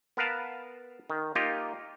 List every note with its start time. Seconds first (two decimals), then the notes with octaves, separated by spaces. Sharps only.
0.17 B3 A#4 B4 F5 A5
1.10 D#3
1.35 A#3 D#4 F4 G4